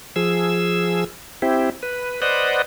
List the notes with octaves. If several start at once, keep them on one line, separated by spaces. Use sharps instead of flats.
F3 G#4 E6
C4 E4 G4
B4
B4 C5 D5 D#5 F#5